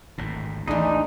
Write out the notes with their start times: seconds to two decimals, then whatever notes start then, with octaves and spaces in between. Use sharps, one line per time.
0.18 G#1 D2 A2
0.68 A1 D#2 E3 G#3 D4 D#4